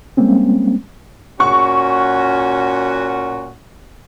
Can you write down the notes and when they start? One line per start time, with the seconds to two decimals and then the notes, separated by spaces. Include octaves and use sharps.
0.17 G3 G#3 A#3 C4 C#4
1.40 A#2 C#4 F#4 C#6